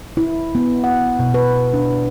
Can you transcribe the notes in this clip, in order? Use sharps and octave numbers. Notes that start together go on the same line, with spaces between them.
E4
B3
F#5
B2
B4
D4